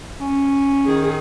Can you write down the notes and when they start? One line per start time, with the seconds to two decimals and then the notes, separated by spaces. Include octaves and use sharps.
0.20 C#4
0.86 D#3 G#4